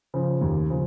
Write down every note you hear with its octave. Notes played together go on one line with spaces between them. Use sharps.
C#3 F3
D#2
C#3 F3